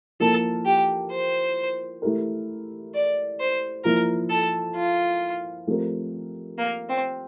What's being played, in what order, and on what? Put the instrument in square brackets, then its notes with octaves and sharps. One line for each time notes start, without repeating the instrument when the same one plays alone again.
[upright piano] F3 A#3 E4 A#4 [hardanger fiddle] A4
[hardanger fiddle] G4
C5
[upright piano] A3 E4 G4 A#4
[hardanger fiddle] D5
C5
[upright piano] F3 A#3 E4 [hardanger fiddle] A#4
[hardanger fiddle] A4
F4
[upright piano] F3 A3 C4 G4 A#4
[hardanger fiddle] A#3
C4